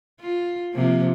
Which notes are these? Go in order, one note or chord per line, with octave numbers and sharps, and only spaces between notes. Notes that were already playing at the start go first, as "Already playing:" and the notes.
F4
C3 F3 A#3